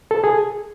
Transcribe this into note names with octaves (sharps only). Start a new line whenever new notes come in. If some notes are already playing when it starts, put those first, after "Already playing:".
A4
G#4